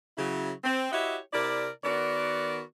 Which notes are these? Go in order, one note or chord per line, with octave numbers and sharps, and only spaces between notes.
C#3 F#3 E4
C4
E4 F#4 G4 C#5 D#5 E5
C3 E4 A#4 D5
D#3 B3 F#4 A#4 D5